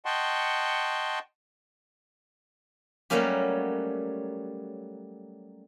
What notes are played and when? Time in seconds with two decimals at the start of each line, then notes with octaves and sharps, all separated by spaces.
0.06 D#5 F#5 G5 A5 C6 C#6
3.10 F#3 G3 A3 A#3 C#4 G4